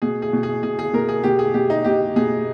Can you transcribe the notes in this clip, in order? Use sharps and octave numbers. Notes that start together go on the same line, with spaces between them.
B2 G#4
G#4
B2
G#4
B2 G#4
G#4
B2 A#4
G#4
B2 G4
G#4
B2 G4
D#4
B2 G4
B2 G#4